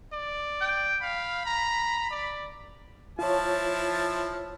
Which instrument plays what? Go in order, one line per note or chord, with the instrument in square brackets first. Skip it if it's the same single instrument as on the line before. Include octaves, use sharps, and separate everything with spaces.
[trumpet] D5
[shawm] G5
[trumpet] F5 [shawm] B5
[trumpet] A#5
D5
[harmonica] F3 E4 A5 [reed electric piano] F4 C#5